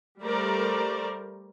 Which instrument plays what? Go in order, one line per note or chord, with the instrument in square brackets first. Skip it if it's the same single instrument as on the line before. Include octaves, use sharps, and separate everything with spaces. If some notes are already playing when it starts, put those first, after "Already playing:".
[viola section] G3 A3 A#4 C5 D5